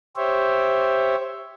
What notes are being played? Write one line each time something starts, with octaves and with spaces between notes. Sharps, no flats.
G4 C5 C#5 E5